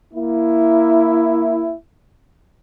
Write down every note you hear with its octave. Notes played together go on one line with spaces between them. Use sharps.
A#3 E4